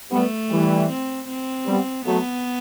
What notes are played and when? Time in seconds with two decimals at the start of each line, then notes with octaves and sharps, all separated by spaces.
0.11 G3 A3 B3
0.51 E3 G3
0.89 C4
1.28 C4
1.67 G3 B3
2.06 F#3 A3 B3